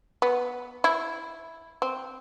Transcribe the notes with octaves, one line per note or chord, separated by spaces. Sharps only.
B3
E4
C4